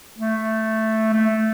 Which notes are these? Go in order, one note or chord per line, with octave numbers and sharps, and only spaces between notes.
A3
A3